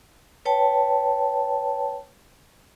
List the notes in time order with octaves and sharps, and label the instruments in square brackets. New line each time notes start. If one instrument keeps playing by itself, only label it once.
[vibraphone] B4 C#5 G5 A5